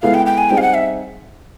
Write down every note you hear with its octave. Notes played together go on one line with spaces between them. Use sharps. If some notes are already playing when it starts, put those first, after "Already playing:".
G#3 B3 E4 A4 F5
G5
G5
G#5
G3 C4 D#4 G#4 G5
F5
F#5
E5